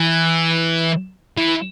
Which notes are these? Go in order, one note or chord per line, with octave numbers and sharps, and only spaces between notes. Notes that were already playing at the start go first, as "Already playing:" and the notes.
Already playing: E3
E3